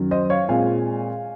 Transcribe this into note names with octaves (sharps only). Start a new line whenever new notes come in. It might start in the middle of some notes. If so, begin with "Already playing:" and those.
Already playing: F#2 D#3 F#3
C5 D#5
C#5 F5
A#2 G#3 C4 F5 G#5